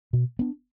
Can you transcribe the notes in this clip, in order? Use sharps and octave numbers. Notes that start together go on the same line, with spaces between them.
B2
B3 D4